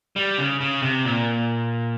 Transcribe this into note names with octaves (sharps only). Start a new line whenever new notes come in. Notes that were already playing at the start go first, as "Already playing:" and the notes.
G3
C#3
C#3
C3
A#2